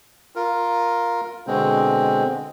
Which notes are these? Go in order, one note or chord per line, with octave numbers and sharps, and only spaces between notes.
F4 A#4
B2 D3 G#3 C4